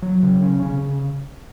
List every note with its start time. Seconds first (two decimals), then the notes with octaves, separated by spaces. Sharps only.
0.02 F#3
0.23 C#3
0.42 C#4
0.62 C#3